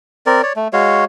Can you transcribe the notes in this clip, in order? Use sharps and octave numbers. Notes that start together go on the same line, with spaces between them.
C4 A#4 D5
C#5 D5
A3
G#3 F#4 C#5 F5